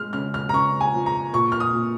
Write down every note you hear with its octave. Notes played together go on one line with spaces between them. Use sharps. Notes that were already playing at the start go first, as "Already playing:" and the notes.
Already playing: G#3 F6
C#3 F6
F6
A#5
C#3 C#6
G#5
F3
A#5
A#2 C#6
F6
D#6
A#2